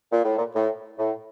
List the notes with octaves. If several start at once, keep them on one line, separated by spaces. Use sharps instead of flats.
A#2
A2
A#2
A2
A2